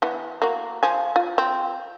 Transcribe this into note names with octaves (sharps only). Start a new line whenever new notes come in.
E3 B3
A#3 F#4
F3 G#5
F4
C4